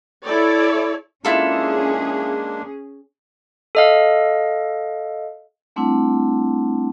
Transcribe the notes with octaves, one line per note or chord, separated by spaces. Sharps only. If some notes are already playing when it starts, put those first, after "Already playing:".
E4 A4 C#5 D5
G#3 A#3 C#4 D4 E4 F4 G#4 A4
A4 D#5 F5
G3 A3 C4 D4 E4 F#5